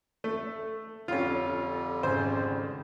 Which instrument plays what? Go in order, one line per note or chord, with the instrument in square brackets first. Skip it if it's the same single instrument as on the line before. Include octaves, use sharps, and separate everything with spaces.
[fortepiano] A3
[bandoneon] F2 D3 G3 [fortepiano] C#4 F4
[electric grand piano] G#1 C#3 G#5 [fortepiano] C5